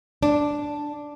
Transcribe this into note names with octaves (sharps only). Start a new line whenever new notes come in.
D4